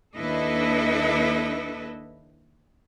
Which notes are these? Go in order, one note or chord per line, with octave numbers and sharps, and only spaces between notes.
D#2 D4 E4 A4 B4 D#5